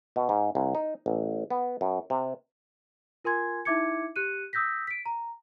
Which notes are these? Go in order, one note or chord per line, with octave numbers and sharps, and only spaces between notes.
B2
G#2
C2
D#4
A1
B3
F#2
C3
F4 A#4 G#5 C6 G#6
D#4 E4 E5 D6 G#6 C#7
G4 F#6 C#7 D#7
D#6 E6 G6 A#6 B6
B6 D7
A#5